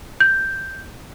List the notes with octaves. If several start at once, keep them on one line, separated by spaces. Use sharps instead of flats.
G6